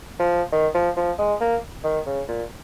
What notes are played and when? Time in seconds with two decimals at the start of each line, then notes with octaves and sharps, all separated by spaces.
0.19 F3
0.52 D#3
0.74 F3
0.96 F3
1.19 G#3
1.41 A#3
1.84 D#3
2.06 C#3
2.28 A#2